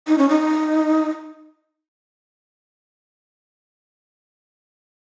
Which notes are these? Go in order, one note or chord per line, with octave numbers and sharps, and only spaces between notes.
D#4
C#4
D#4